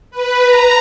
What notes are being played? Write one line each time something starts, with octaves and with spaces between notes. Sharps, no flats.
B4
A#5